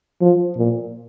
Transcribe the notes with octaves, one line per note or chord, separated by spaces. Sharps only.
F3
A#2